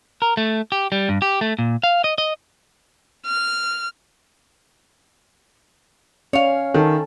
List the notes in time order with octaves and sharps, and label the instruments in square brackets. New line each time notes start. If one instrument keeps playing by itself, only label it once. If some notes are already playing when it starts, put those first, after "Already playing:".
[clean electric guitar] A#4
A3
G4
G3
G2
G4
A3
A#2
F5
D#5
D#5
[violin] F6
[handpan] C#4 [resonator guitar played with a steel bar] C#5 F5
[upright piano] D#3 [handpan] A4